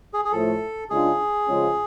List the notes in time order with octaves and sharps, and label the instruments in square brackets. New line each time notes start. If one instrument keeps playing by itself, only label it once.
[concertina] G#4
G#4
[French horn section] A2 F3 A3 [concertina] A4
[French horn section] C#3 G#3 D4 F4 [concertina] G#4
[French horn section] C#3 F3 G#3 C#4 F4